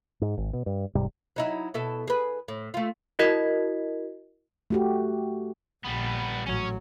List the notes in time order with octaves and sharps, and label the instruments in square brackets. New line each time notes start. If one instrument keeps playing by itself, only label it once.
[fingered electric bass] G#2
G#1
B2
G2
D#1 G#2 C3 G3
[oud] F#3 D#4 E4
B2 E4 A4
G#4 B4
A2
A3 F4
[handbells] E4 F#4 A#4 D#5 G#6 B6
[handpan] A3 F#4 G4
[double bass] A#1 [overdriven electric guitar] G3 B3
[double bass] A1 F#3 [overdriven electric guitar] C#4 C#5